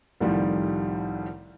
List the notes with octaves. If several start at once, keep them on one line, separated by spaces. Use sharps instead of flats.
C2 A2 D#3 F3 G3